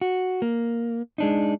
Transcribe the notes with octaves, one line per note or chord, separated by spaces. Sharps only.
F#4
A#3
G#3 D4 D#4